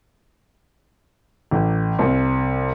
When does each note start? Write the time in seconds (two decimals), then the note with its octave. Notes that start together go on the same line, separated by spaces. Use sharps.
1.51 A1
1.99 C2